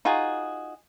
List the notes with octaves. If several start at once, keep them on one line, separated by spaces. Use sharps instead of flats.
D#4 F4 F#4 G#4